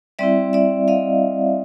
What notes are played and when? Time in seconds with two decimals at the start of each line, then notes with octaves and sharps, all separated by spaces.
0.19 G3 C4 E4 D5 E5
0.53 D5 E5
0.88 D#5 F5